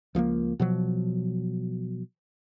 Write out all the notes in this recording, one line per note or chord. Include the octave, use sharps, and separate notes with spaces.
C#2 F3 G#3 A#3
B2 F3 F#3